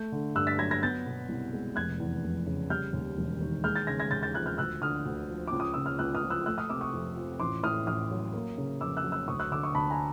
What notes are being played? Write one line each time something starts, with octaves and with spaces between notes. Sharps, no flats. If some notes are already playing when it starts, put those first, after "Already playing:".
Already playing: A3 G6
D3
G2 E6 F#6
A6 B6
F#3 G#6 A#6
G#6 A#6
B3 G6 A6
B2
C2
G#3
F1 F#6 G#6
E2
F1
C#3
G3 F6 G6
D#2
E1
D#3
G#3 F6 G6
G6 A6
C#3 G#6 A#6
G#6 A#6
D#2 G6 A6
G6 A6
F3 F#6 G#6
F6 G6
D2 E6 F#6
D3 D#6 F6
D2
F3
C#2 D6
D#6
C#3 E6
F6
C#2 E6 F#6
D#6 F6
F3
E6 F#6
A3 E6 F#6
D#6 F6
C3 D6 E6
C#6 D#6
F2
F3
A1 C6 D6
A2 D#6 F6
A1 D#6 F6
F#3
A#3
C#3
F2 D6 E6
E6 F#6
F#3
E6 F#6
D2 C#6 D#6
E6 F#6
D3 D6 E6
C#6 D#6
D2 A5 B5
G#5 A#5